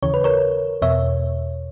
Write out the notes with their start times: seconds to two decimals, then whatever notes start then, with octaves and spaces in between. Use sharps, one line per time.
0.03 D#2 C#3 E3 C#5
0.14 B4
0.24 A#4 C#5
0.82 E2 B2 C#5 E5